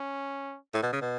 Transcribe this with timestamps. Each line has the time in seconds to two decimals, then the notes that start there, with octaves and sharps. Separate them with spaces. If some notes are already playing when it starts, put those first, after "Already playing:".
Already playing: C#4
0.74 A2
0.83 B2
0.92 C#3
1.01 B2